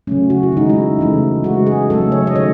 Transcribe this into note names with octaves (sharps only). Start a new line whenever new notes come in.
C#3 F#3 A3 C#4
F#4
E4
D#3 G#3 D#4
E4
C#3 E3 A3
C#3 G#3 F#4
G#4
C#3 F#3 A3 A4
C#5
D#5
D#3 A3 C#5